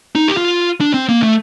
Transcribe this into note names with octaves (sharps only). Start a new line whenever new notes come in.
D#4
G4
F4
D4
C4
A#3
A3